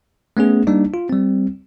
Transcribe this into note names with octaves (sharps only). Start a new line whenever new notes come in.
A3 B3 C#4 G#4
G3 A#3 D4 D#4
F4
G3 C4